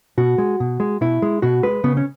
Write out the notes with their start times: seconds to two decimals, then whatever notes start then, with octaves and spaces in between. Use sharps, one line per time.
0.18 B2 F#4
0.38 G#3
0.60 B2
0.80 G#3
1.01 B2 E4
1.22 G#3
1.42 B2 F#4
1.63 G#3 B4
1.84 C#3 B3
1.97 C#4